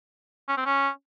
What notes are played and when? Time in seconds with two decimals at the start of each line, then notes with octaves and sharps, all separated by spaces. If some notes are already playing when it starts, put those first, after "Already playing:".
0.49 C#4
0.57 C4
0.66 C#4